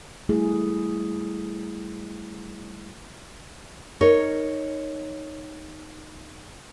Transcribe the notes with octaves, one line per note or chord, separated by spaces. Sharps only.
G3 A3 E4 G#4
D#4 A#4 C#5